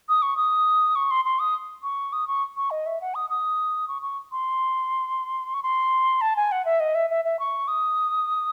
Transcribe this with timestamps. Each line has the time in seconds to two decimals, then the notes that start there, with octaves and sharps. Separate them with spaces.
0.09 D#6
0.22 C#6
0.37 D#6
0.96 C#6
1.11 C6
1.25 C6
1.39 D#6
1.83 C#6
2.13 D#6
2.28 C#6
2.57 C#6
2.71 D#5
2.86 E5
3.01 F#5
3.15 D#6
3.30 D#6
3.88 C#6
4.02 C#6
4.32 C6
5.54 C#6
5.63 C6
6.21 A5
6.36 G#5
6.52 F#5
6.65 E5
6.80 D#5
6.95 E5
7.10 E5
7.25 E5
7.39 C#6
7.68 D#6